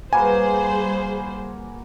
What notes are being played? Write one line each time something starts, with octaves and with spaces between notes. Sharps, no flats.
G3 A#3 F#4 G#4 B4 C5 G#5